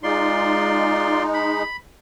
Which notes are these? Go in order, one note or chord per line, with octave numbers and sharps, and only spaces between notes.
G#3 D#4 F4 D5 C6
B5